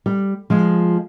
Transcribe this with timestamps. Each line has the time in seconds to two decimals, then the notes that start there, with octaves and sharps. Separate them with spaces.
0.06 G3
0.50 F3 G#3